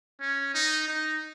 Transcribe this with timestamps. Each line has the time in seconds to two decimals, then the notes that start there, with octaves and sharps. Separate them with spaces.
0.20 C#4
0.54 D#4
0.88 D#4